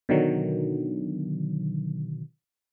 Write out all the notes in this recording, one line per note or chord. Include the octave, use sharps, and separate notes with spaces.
B2 D3 D#3 F#3